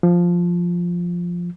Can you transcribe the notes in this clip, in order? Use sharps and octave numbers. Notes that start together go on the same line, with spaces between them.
F3